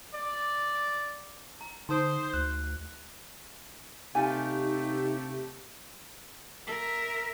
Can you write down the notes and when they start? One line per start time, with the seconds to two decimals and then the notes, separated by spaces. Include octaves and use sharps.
0.14 D5
1.61 A#5
1.89 D3 D#4 C5 C6 D#6
2.34 D2 F#6
4.15 C3 A3 D#4 F4 G4 G#5
6.67 A#4 E5